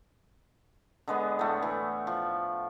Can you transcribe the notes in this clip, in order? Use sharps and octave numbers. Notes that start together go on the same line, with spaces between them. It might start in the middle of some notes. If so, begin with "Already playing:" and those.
D3 G#3 B3
A2 A3
E3
F3